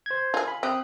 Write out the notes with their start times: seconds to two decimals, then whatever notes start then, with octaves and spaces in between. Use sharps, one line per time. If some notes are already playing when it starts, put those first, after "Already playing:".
0.06 C5 G#6
0.34 F4 G#4
0.48 B5
0.63 C4 G4 D#6 F#6